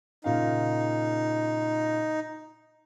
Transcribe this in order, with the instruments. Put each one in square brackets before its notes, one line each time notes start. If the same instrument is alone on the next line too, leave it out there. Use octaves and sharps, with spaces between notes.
[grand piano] A#2 C#3 F5 [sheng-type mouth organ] D#4